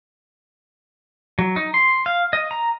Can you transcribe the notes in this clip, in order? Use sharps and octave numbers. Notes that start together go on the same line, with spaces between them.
F#3
D#4
C6
F5
D#5
A#5